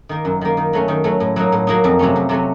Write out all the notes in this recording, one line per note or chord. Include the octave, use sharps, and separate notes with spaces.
D#3 A#3
F#2
D#3 A#3
D#3
F#3 A3 C#4
D#3
F#3 A3 C#4
A2
F#3 A#3 D#4
A2
F#3 A#3 D#4
F2
C3 F#3 A3 C#4
F2
C3 F#3 A3 C#4